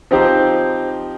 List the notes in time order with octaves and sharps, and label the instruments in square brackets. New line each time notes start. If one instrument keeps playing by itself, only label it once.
[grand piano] F3 C4 D#4 G4 C5